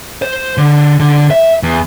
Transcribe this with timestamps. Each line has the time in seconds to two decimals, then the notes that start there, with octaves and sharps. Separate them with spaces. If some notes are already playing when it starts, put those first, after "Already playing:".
0.22 C5
0.58 D3
1.00 D3
1.31 E5
1.63 E2